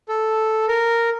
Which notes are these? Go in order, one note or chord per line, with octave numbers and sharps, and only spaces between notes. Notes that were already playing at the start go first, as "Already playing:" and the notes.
A4
A#4